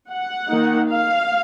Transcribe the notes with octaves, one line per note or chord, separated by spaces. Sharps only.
F#5
D#3 A#3 D#4
F5